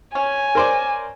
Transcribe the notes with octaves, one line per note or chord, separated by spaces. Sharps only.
C#4 G#5
A#4 C5 D5